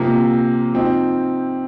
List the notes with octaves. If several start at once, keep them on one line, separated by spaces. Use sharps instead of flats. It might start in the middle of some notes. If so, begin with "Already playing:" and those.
Already playing: C3 F3 A#3
F3 C4 D#4